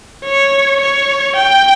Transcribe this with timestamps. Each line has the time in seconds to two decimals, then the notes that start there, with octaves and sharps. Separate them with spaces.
0.24 C#5
0.81 C#5
1.36 G5